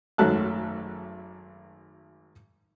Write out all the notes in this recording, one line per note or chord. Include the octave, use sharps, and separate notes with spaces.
G#1 F#2 F#3 A3 A5 F#6